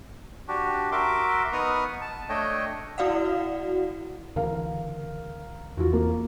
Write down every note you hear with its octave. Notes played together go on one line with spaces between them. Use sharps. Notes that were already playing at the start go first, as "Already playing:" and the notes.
D4 F#4 G4
F#4 A#4 E5 C6 D6
B3 D#4 B4 C#6 D#6 F6
A5
A3 D4 C#5 D#5 G5
E4 F#4 D5 F5 F#5
C#2 D3 E3 A#4 F5
E2 E3 F4 F#4
A#3